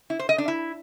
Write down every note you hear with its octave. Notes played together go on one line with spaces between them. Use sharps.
E4
C5
D#5
D4
E4